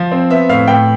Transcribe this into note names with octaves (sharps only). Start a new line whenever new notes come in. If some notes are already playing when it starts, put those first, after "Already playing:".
Already playing: F3
C4
B3 E5
A2 F5
A2 G5